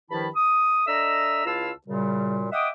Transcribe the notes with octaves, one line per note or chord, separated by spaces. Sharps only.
G2 D#3 F3 E4 A5 B5
D#6
D4 A4 D#5 E5 A#5 E6
C#2 E4 F4 F5 A5 E6
F#2 A#2 C#3 G3
D#5 E5 F#5 G5 D6 D#6